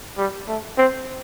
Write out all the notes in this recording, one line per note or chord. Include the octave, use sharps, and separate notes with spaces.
G3
A3
C4